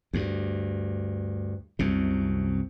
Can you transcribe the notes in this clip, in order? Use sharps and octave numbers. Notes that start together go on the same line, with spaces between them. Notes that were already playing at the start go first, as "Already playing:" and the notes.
D2 G2
C2 F#2 C3